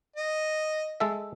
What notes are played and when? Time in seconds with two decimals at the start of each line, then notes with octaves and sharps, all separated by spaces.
0.16 D#5
1.00 G#3 A4 E5